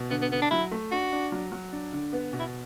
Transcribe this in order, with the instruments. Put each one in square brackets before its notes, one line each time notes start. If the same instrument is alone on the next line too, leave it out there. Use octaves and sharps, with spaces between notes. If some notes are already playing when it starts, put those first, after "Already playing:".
Already playing: [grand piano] B2
[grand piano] D3 [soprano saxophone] B3
[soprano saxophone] B3
[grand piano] D3 [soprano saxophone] B3
[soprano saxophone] D4
[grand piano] F#3 [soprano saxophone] E4
[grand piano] A3
[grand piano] D4 [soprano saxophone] F#4
[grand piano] D4
F#3
F#3
D4
D3
B3
B2
[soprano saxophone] E4